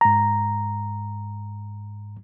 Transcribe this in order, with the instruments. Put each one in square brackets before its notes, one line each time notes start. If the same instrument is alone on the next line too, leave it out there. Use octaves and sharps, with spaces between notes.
[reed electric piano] G#2 A#5